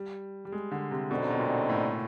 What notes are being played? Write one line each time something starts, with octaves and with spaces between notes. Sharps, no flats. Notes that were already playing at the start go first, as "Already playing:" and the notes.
Already playing: G3
G3
G#3
D3
C3
F#2 B2 D3 G3 C4 D#4
B2
A#2
A2